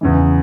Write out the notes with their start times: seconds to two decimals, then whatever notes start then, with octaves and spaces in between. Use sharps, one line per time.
0.01 E2 C#3 E3